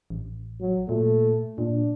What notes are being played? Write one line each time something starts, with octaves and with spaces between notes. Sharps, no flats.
A1
F#3
A#2 A3
A#2 D4